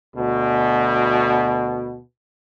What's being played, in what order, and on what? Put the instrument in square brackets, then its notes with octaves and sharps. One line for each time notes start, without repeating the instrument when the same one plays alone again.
[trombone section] D2 B2